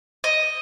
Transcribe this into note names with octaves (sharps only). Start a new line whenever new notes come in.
D#5